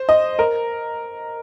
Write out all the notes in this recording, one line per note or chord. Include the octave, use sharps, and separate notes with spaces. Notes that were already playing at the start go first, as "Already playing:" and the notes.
Already playing: C5
D#5
A#4